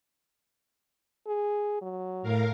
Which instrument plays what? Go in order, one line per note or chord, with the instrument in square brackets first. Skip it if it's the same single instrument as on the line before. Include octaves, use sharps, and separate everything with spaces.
[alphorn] G#4
F#3
[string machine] A2 A#4 F5